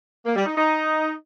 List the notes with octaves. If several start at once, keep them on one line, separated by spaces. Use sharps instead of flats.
A#3
G3
D#4
D#4